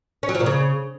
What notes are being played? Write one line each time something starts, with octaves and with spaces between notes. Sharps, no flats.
C#4
F#3
F3
A#2
C#3